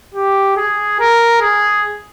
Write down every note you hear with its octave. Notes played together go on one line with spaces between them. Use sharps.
G4
G#4
A#4
G#4